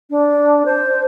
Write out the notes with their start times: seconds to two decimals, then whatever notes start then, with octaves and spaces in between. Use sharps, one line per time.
0.10 D4
0.65 C5